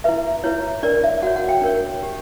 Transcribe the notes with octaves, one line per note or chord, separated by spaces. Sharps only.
E4 B4 E5
E4 B4 C#5
D4 A#4 C#5 D5
E5
F#4 C#5 F#5
F#5
G5
D4 A#4 C#5
D4 G4 C#5